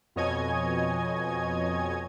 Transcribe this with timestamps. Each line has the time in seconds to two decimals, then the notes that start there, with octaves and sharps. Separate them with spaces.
0.16 F2 B2 C#5 D#5 G#5 G#6